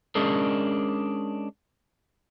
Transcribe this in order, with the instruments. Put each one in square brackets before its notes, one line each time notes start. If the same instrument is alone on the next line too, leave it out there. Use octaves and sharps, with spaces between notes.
[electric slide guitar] G#3 C#4 D4 G#4 A#4